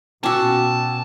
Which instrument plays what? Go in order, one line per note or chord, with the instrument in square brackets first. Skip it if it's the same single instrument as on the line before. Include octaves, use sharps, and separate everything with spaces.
[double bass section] B2 [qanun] C#4 F#4 [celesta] G5 D6 E6 [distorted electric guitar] A5